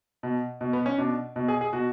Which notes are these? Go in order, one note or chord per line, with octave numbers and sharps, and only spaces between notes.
B2
B2
B3
C#4
B2 D4
B2
G#4
G#4
B2 F#4